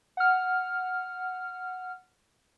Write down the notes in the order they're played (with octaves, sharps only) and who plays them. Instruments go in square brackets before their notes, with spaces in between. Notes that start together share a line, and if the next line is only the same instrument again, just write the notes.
[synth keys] F#5 F6